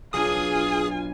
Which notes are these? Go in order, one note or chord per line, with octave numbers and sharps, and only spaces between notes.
B1 D4 F4 G#4 G#5 D#6